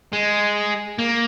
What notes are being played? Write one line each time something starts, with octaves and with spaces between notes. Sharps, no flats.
G#3
A#3